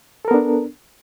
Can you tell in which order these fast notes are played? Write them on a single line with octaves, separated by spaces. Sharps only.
A4 A#4 B3 D4